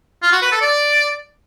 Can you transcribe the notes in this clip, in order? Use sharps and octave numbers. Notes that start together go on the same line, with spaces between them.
F4
F#4
B4
A4
D5